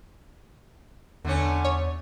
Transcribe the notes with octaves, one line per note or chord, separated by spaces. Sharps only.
E2 D3 A3 C#4
C#5